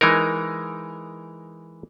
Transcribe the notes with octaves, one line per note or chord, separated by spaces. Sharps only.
E3 G#3 D#4 A#4